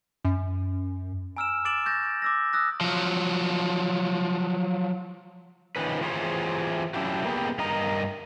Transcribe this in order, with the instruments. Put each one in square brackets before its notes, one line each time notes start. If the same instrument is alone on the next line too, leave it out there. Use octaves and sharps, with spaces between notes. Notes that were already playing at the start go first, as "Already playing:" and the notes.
[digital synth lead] F#2
[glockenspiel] G#5 A#5 E6 F6 D7 E7
D6 E6 A6 D7 E7 F#7
C#6 G6 A6 A#6
D6 E6 A#6
D#6 E6 F#6 A#6
[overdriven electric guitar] F3 F#3
[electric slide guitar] D#3 F3 C#4 B4
E3 F4 G4 G#4 C5 C#5
F#3 C#4 D4 E4 F#4 G4
A#3 B3 G4 G#4
G2 A#4 D#5 A#5